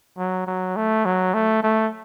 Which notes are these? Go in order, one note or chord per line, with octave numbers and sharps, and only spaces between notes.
F#3
F#3
A3
F#3
A3
A3